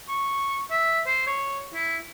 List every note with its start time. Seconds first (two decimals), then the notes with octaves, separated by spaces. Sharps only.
0.08 C#6
0.71 E5
1.07 C5
1.27 C#5
1.74 E4